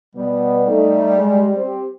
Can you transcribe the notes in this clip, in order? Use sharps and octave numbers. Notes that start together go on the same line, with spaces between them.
B2 G3 B3
A3 D#4
G#3 G4
C4 G4